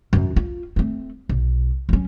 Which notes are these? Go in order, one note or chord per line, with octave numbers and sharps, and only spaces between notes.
F#2 D#3
F4
A3 C4
B1
F#3 C#4